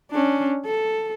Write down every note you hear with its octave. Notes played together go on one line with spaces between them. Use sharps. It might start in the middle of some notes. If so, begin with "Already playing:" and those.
C#4 D4
A4